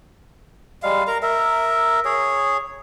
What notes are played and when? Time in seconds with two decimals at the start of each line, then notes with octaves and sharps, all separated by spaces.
0.83 G3 G#3 F5
1.07 A#4 A#5
1.23 A#4 E5
2.05 G#4 C#5